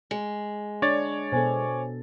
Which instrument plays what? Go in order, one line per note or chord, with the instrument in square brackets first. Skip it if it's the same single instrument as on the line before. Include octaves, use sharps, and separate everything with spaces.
[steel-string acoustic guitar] G#3
[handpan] D4 [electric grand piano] C#5 D5 A6
[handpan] B2 B3 A4 [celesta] C5 G#5